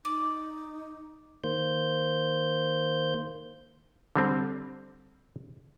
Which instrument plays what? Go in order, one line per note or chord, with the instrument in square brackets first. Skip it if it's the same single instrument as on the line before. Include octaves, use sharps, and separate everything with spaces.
[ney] D#4 [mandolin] D5
[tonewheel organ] D#3 A#3 C5 G6
[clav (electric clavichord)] D3 G3 C4